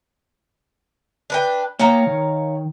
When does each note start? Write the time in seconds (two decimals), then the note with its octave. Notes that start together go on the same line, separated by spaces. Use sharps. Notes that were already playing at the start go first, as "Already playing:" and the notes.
1.30 D4 B4 G5
1.79 A#3 C#5 F5 G5 A#5
2.06 D#3